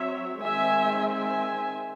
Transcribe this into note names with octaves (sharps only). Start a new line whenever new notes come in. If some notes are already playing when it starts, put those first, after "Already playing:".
Already playing: F#3 C4 C#5 E5
D#3 G#3 C4 E5 G#5
E5 G#5